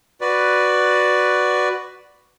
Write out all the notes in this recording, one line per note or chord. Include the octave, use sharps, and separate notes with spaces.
F#4 B4 D5